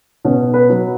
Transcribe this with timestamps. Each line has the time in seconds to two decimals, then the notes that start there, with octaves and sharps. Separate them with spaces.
0.25 B2 C#4
0.54 B4
0.69 F#3